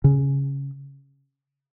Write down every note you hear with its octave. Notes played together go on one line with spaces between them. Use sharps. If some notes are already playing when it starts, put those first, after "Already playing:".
C#3